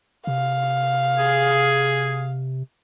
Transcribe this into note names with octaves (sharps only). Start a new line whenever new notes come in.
C3 F5
G#4